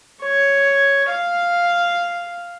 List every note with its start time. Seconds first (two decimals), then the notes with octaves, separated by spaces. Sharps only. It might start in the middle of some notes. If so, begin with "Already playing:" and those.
0.23 C#5
1.11 F5